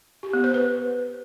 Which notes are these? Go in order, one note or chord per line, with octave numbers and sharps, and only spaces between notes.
G4
B3
C5
B4